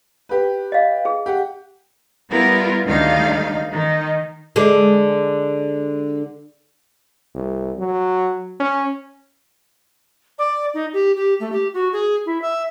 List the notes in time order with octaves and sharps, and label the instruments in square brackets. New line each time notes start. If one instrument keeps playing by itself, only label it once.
[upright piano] G4 B4
[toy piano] D#5 F5
G#4
[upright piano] G4 F#5
[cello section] G3 B3 E4 F4 A#4
D2 D#3 G3 D#4 F5
D#3 D#4
[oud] D3 G#3
[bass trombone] C2
F#3
C#4
[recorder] D5
D#4
G4
G4
A3
G4
F#4
G#4
E4
E5